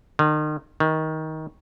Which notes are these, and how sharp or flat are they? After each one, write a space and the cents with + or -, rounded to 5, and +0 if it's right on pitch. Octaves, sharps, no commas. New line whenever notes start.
D#3 -35
D#3 +20